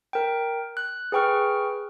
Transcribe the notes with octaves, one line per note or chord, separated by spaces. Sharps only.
A#4 G5
F#6
G#4 B4 G5 C#6 F6